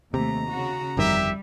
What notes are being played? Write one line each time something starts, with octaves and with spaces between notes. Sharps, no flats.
D#2 C3 A3 A#5
C#3 F#4
G1 F2 D#3 G3 G4 E5